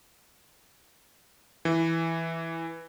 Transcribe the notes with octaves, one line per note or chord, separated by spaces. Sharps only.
E3